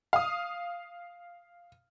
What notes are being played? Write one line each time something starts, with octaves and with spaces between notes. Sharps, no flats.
F5 D#6